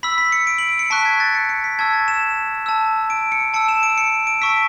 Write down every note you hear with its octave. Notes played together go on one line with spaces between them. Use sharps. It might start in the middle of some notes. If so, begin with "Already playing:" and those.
B5 E6 B6
B6
C#7
D7
F#7
D7
C#7
A5 C#6 F#6 B6
G#6
A6
C#7
C#7
B6
A5 C#6 E6 G#6
A6
E7
A5 E6
D7
C#7
A5 E6 C#7
E7
D7
C#7
D7
A5 C#6 E6 B6